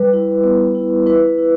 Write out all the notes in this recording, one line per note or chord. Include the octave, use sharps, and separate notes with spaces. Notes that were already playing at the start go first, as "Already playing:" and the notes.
Already playing: G3 B4
E4
B3
E4
E4 B4
E4